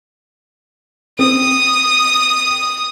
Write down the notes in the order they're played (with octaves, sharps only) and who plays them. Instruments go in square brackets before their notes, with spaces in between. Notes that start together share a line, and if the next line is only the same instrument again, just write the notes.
[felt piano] C4 [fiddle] D#6